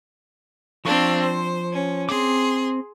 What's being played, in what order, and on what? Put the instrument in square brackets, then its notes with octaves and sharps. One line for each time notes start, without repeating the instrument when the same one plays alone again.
[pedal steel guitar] F3 C#6 [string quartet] C4 D4 F5
[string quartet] C5
C#4
[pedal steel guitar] C4 D6 [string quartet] G#4 C6